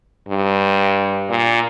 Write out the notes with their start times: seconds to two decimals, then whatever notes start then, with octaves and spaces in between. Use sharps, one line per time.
0.29 G2
1.30 A#2